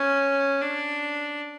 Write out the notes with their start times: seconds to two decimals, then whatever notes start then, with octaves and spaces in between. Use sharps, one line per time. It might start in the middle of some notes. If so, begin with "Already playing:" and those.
Already playing: C#4
0.61 D4